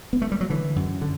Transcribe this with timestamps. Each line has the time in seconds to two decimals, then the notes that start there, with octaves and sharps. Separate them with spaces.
0.13 B3
0.22 A3
0.32 G3
0.41 F#3
0.50 D3 E3
0.76 F#2
1.01 D3